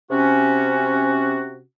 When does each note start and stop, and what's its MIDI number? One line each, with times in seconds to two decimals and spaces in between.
0.11 1.62 48
0.11 1.62 61
0.11 1.62 66